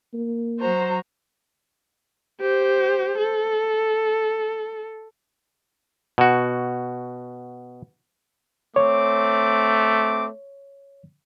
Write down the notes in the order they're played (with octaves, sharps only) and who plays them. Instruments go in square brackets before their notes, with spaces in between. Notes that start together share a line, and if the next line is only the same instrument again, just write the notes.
[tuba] A#3
[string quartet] F#3 F#4 A#5 [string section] C5
[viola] G4 C5
A4
[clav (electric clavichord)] B2 F#4
[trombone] A3 [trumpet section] C4 D6 [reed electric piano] C#5